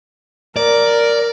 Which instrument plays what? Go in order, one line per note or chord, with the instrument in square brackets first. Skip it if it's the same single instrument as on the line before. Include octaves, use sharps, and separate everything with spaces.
[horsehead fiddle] A#4 [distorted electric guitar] D5